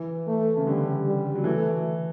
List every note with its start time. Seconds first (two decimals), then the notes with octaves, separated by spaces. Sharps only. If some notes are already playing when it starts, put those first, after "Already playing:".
Already playing: E3
0.27 A3
0.57 C#3
0.66 D3 G3
1.05 G3
1.35 F#3
1.44 E3 A3